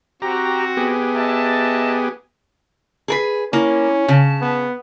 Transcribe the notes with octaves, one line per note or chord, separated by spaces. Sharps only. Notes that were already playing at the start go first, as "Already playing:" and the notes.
C4 F#4 G4 A#5
B3 G4 G#4
D#5 E5 A5
G#4 A#4 B4
A#3 C#4 E4
C#3 A5
B3